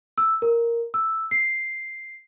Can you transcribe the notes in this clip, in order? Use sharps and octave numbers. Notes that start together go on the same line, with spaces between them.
E6
A#4
E6
C7